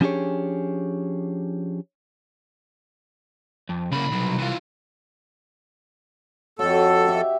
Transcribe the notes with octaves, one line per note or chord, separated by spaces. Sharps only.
F3 C#4 D4 G4 G#4 C#5
F2
C2 C#3 A#3 B5
B1 F#3
E3 F4
F2 F#4 A4 C#5
G4 E5